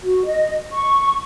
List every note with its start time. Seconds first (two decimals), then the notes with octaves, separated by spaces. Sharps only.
0.04 F#4
0.25 D#5
0.71 C#6